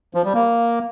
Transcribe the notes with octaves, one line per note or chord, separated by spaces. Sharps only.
F3
G3
A#3